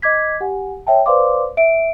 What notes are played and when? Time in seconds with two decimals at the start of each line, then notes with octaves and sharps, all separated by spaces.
0.02 D#5 D6 G#6 B6
0.40 G4 F#5 G#5
0.87 C#5 E5 G5 A5
1.06 B4 C5 D5 F5 C6 D6
1.57 E5 D7